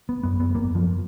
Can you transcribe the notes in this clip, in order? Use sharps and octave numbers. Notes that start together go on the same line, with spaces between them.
B3
F#2 B3
B3
F#2 A#3
F3